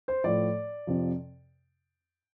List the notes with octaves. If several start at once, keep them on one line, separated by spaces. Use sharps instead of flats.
C5
A2 F3 D5
F2 C3 F3